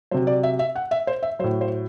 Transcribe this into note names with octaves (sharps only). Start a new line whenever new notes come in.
C3 F#3 C5
D5
E5
E5
F#5
E5
C5
E5
A2 F#3 C5
C5